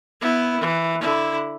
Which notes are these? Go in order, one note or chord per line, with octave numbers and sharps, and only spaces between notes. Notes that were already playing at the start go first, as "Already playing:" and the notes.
B3 E4
E3
D3 E4